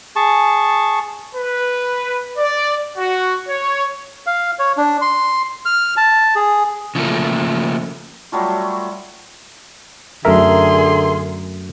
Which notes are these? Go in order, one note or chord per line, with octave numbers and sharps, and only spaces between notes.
G#4 A5 C#6
B4
D5
F#4
C#5
F5
C#5
D4
C6
F6
A5
G#4
C#3 F3 A3 A#3
F#3 G3 A3 F4
F#2 D3 A3 G#4 A#4 E5 A#5 C6